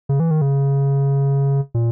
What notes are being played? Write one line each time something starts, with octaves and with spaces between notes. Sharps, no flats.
C#3
E3
D#3
C#3
A#2